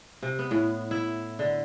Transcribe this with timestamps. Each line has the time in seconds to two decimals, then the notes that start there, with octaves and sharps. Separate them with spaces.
0.22 C3
0.39 B3
0.51 A2
0.91 E4
1.39 D3